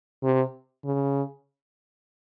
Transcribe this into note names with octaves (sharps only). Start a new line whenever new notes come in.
C3
C#3